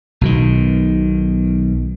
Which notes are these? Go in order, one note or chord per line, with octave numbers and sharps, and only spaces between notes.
B1 B2 D#3